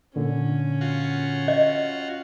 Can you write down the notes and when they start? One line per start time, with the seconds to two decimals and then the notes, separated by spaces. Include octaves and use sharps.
0.16 A#2 D3 C#4
0.81 F4 F#4
1.48 D#5